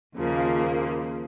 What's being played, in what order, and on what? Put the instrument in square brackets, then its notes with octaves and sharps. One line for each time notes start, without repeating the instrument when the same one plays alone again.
[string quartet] D#2 C#3 F3 A#3